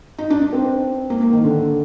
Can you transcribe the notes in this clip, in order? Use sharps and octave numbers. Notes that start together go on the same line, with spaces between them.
D#4
D4
D4
C4
A#3
A#3
D#3
D3